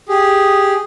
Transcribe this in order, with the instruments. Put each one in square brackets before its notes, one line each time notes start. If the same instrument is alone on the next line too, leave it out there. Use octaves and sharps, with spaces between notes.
[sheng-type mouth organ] G4 G#4